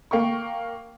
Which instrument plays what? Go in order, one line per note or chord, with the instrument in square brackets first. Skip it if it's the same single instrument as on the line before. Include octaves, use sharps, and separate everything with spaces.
[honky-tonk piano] A#3 G5 C#6